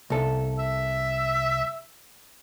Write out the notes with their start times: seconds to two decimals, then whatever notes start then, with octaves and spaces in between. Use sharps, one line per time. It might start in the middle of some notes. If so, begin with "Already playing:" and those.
0.10 C2 A4
0.59 E5